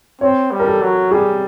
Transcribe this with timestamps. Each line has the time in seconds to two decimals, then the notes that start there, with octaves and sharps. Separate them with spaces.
0.21 C4 C#5
0.51 G3
0.60 A#4
0.66 A4
0.82 F#3
1.11 G3 G#4